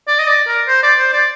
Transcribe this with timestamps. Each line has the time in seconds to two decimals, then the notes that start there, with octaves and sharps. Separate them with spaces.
0.08 D5
0.19 D#5
0.27 D5
0.47 A#4
0.68 C5
0.83 D5
0.99 C5
1.13 D5